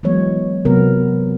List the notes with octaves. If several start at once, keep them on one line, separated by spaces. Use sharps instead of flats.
E3 F#3 G#3 B3 C#5
C3 F#3 B3 A#4